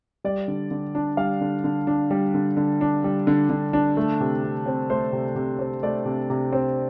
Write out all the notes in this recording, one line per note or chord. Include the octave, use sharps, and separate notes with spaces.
G3 D5
D3
D3
D4
G3 F5
D3
D3
D4
G3
D3
D3
D4
G3
D3
D3
D4
A3
C3
C3
C4
A3 C5
C3
C3
C4
A3 D5
C3
C3
C4